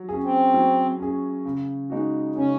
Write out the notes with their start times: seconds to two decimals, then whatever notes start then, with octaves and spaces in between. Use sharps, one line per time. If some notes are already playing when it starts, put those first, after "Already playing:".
Already playing: F#3
0.09 C#4 G#4
0.24 C4
0.54 F#3
1.00 C#4 G#4
1.45 C#3
1.90 G#3 D#4 F#4
2.35 C#3 C#4